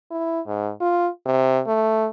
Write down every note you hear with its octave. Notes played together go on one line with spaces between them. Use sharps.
E4
G#2
F4
C3
A3